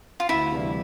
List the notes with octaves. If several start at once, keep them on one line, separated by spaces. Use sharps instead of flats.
F4
D2 E4
C3 E3 G3 D4